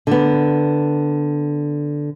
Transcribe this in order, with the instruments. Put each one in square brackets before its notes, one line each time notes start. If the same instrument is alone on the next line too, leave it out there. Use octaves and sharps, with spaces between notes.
[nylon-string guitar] D3 B3